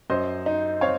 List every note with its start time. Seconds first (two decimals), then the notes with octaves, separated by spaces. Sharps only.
0.10 F#2 C5 D#5
0.46 D#4
0.81 C4 C#5 F5